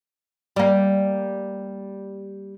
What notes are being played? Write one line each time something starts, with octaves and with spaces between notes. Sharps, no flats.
G3 A#3